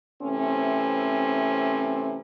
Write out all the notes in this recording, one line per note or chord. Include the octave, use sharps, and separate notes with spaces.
C3 E3 A3 C4 C#4